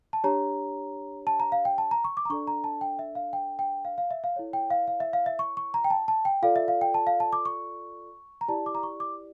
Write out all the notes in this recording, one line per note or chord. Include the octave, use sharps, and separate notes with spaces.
A5
D4 G4 C#5 A#5
A5
A#5
F5
G5
A5
A#5
C#6
D6
A#5
D4 A4 D5 C#6
A#5
A5
G5
E5
F5
G5
G5
F5
F5
E5
F5
E4 A4 C#5
G5
F5
F5
E5
F5
E5
C#6
C#6
A#5
G5
A5
A5
G5
F4 A4 D5 F5
E5
F5
G5
A5
F5
A5
D6
C#6
A#5
E4 G4 D5 A5
D6
A#5
C#6
D6